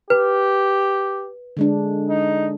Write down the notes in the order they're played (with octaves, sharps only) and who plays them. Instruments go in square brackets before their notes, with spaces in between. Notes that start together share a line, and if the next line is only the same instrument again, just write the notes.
[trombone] G4 [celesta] B4
[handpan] D3 G#3 D4
[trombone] D#4